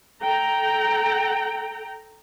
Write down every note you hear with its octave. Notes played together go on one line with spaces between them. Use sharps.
A4 G5 A#5